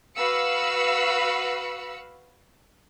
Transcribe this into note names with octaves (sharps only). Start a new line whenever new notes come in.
F#4 B4 F5 B5 E6 C#7